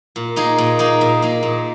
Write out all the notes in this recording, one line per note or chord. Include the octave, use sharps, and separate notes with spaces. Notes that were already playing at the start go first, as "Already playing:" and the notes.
A#2
A#3 D#4 G#4
A#2
A#3 D#4 G#4
A#2
A#3 D#4 G#4
A#2